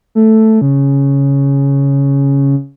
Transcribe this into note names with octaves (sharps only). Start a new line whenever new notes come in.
A3
C#3